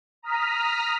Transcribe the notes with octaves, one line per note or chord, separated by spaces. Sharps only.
A#5 D#6 F6 B6